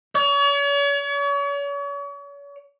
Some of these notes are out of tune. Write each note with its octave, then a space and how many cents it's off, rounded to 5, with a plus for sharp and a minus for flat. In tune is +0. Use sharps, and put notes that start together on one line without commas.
C#5 +40